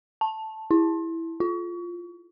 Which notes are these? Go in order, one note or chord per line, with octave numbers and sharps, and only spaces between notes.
A5
E4
F4